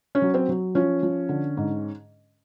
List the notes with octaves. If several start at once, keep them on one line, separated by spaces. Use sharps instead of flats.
C#4
F#3
C4
F#3
F3 C#4
F3
D3
G#2